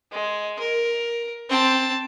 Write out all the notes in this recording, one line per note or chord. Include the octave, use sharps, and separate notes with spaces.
G#3
A#4
C4 A5